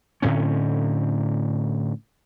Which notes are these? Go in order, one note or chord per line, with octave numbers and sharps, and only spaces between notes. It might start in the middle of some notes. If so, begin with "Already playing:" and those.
A2 D3 C4 C#4